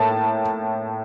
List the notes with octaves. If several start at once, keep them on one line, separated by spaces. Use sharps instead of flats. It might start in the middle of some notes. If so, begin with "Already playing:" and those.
Already playing: A2 A#3 A5